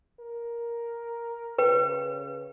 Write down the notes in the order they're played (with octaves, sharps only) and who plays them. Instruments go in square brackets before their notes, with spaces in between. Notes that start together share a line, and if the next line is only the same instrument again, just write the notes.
[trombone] A#4
[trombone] C#3 [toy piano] B4 G5